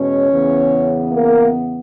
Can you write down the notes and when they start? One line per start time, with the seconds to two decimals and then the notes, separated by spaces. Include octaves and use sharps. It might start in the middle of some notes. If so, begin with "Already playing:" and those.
Already playing: E2 B2 G#3 C#4 C#5
0.31 E2 C#3 E3 B3
1.12 A#3 A#4